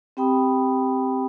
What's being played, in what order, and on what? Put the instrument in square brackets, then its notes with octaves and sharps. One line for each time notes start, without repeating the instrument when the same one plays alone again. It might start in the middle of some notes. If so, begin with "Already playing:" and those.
[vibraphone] C4 G4 G5 B5 D#6